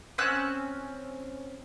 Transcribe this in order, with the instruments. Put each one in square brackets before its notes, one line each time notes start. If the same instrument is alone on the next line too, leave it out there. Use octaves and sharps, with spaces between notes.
[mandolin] C4 C#4 E6 F#6